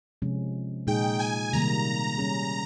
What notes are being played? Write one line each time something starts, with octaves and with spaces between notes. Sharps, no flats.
C3 F3 G#3 C#4
A#2 G#3 D#4 G#4 G5
G#5
C3 D#3 G3 A#3 A#5
G3 C#4 G#4